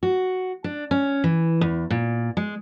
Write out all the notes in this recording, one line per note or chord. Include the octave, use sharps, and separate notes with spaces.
F#4
D4
C#4
E3
E2
A#2
G#3